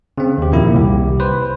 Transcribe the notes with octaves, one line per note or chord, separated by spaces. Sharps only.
C#3 C4
D#2 G4
F2 A#2 D#3 A#3 E4
C2 G4
B4 C5